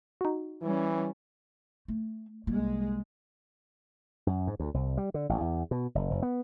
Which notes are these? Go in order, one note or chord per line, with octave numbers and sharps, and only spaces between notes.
D#4 F#4
E3 G3 C#4
A3
C2 G3 G#3 A#3
F#2
G#2
D2
C2
G3
D3
A1
E2
B2
F#1
F#1
B3